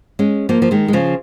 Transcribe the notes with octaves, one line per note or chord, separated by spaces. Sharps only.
G#3 C#4
F3 A#3
F3
D#3 G#3
G#3
C#3 F3